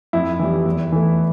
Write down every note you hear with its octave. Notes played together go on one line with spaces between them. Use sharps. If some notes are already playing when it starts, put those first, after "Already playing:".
F2 E4
E3 G3
E2
E3 A3